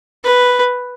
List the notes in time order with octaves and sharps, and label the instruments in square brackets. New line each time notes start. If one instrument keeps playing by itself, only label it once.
[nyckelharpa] B4